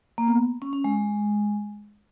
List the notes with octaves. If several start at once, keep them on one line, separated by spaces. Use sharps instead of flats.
A#3
B3
C#4
C#4
G#3